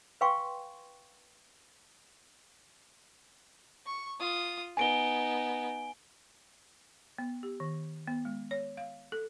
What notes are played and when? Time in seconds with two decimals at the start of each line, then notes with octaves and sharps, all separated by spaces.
0.21 B4 F5 G5 G#5 C6 C#6
3.86 C#6
4.20 F4 D#6
4.77 B3 D#4 G#5 D7 G7
7.18 B3
7.43 G4
7.60 D#3
8.07 B3
8.25 G#3
8.51 C#5
8.77 F5
9.12 A4